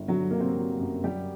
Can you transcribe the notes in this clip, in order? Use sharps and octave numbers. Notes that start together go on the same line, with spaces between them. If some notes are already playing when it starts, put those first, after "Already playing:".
Already playing: G1
D3 F#3 F#4
D3 A#3
C3 C4
F#3
F#2
F#3 G3 G4